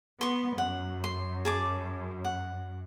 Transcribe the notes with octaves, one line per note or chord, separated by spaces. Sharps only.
B3 C6 C#6
F#2 F#5
C6
G#4 A5 D6
F#5